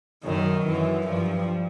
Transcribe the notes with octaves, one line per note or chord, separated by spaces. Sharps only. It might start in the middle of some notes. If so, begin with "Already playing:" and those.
F#2 D#3
F#2 E3
G2 F3